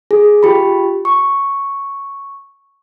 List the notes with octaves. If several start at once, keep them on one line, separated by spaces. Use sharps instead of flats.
G#4
F4 G4 B5
C#6